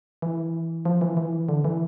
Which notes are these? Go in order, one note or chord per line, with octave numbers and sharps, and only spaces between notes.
E3
F3
E3
E3
D3
E3